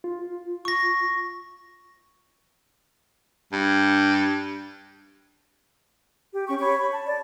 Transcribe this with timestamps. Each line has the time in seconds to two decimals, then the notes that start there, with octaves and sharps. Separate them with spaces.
0.04 F4
0.65 C#6 A#6
3.52 G2
6.33 G4
6.48 C#4 G4 C#6
6.59 C#5 B5 C#6
6.77 B5
6.90 A5
7.05 D5